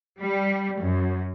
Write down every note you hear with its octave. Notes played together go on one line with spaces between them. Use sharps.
G3
F#2